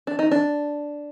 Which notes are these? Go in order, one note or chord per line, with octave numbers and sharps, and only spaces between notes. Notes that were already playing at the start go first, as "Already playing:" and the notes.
D4
D#4
D4